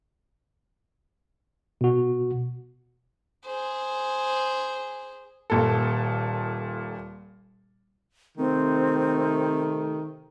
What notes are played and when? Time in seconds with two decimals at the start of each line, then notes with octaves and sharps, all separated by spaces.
1.81 B2 F#4
3.46 G#4 C5
5.50 D#1 A#2 A4
8.38 C3 D#3 A3 C4